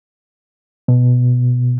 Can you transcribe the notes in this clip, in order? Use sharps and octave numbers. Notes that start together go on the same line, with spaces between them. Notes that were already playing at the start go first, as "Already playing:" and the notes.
B2